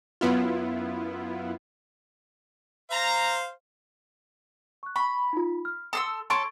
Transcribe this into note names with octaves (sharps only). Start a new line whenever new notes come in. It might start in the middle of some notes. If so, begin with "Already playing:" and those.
F#2 B3 E4 F4
C5 F5 A#5
C#6 F#6
B5 C#6
D#4 F4
F6
A4 C6 D#6 E6
A4 C#5 C6 C#6 A6 D7